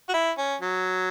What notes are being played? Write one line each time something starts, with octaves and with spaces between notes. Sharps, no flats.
F#4
E4
C#4
F#3